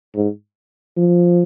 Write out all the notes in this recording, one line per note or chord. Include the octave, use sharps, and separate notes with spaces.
G#2
F3